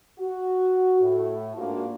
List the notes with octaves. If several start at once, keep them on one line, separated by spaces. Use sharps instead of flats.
F#4
A2
G#2 A#3 D4 F4 F#4